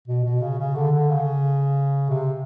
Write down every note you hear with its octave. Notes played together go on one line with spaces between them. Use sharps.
B2
B2
C#3
C#3
D3
D3
C#3
C3